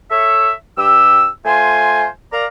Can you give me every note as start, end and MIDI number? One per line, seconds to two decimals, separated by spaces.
0.10 0.51 69
0.10 0.51 73
0.10 0.51 76
0.78 1.27 43
0.78 1.27 67
0.78 1.27 88
1.45 2.07 57
1.45 2.07 65
1.45 2.07 72
1.45 2.07 80
2.31 2.45 70
2.31 2.45 74
2.31 2.45 77
2.31 2.45 82